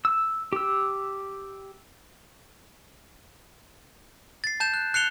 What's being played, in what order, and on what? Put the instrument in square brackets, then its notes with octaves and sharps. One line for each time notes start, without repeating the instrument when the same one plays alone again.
[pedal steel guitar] E6
G4 E6
[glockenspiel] A6 C7
A5 G6 E7
F#6
F#6 C7 C#7 F7 G7